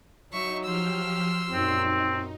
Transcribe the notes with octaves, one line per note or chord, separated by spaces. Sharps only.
F#3 D#4 E5 C#6
F3 G4 C6 E6 F6
F#2 A#2 C4 D#4